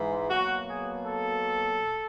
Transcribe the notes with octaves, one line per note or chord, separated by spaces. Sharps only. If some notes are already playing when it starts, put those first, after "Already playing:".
Already playing: G#2 E3 G#3
B2 F#3 A#3 F#4
G#4
A4